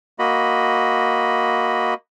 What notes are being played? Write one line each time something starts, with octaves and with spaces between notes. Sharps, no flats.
A#3 F#4 D#5 B5